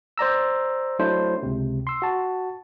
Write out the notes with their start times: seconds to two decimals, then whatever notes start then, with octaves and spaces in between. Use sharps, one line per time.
0.18 C5 D5 A#5 E6
0.99 F#3 A3 D4 E4 C5
1.43 C#2 C3
1.87 C6 E6
2.02 F#4 A5